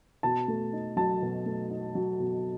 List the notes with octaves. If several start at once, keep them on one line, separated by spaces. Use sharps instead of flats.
B2 A5
A3
D#4
F#3 A5
B2
A3
D#4
F#3
B2